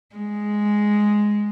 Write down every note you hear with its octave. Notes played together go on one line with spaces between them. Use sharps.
G#3